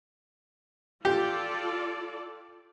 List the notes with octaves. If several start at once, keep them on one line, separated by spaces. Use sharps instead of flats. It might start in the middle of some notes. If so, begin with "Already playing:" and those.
F4 G4 A4 D5